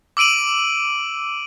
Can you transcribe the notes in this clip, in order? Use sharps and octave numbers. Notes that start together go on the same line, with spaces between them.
D6 E6 D7 D#7 F#7